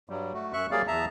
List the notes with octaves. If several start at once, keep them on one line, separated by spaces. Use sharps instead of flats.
G2 F#3 G3
A3 F#4
F#2 E5 C#6 F#6
F#3 G3 A#3 G#4 D5 F5
E2 E5 A5 A#5